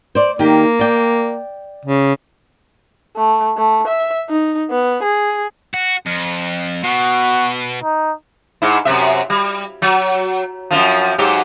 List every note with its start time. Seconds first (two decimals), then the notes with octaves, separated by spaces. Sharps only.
0.15 C5 D5
0.39 D#3 A#3 G4
0.79 D5 G5
1.85 C#3
3.16 A3
3.57 A3
3.87 E5
4.29 D#4
4.71 B3
5.03 G#4
5.74 F#4
6.06 F2
6.84 B2 F#4
7.83 D#4
8.62 G#2 E4
8.85 F#2 C3 E5
9.30 G3
9.82 F#3
10.71 F#2 D3 F3
11.18 G#2 F#3 G4